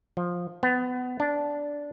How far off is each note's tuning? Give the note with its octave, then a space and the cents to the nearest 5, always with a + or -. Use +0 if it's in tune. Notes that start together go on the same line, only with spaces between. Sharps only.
F3 +10
B3 +25
D4 -10